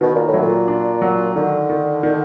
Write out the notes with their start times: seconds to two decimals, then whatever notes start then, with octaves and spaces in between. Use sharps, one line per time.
0.01 B2 D#3
0.14 A#2
0.27 A2
0.34 F#3
0.41 A#2
0.68 D4
1.02 F#3
1.36 D3 D#3
1.70 D#3
2.03 D#3